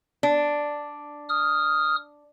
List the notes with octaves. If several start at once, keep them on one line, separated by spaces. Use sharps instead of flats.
D4
D#6 F6